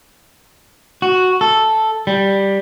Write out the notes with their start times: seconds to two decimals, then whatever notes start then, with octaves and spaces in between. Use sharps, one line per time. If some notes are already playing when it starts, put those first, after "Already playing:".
1.02 F#4
1.41 A4
2.07 G3